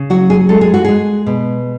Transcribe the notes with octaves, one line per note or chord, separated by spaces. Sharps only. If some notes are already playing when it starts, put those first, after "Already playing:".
Already playing: C#3
F#3 F#4
G#4
G#3 A4
G#4
F#4
G#3 G#4
B2